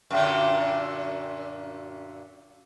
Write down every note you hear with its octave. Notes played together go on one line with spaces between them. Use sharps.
F#2 A#2 D3